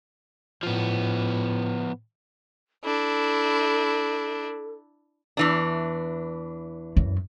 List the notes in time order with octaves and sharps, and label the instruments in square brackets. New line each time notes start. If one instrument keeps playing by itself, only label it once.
[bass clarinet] A2 [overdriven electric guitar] F3 B3
[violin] D4 E4 [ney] A4
[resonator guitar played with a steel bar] E2 E3 D4
[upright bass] F#2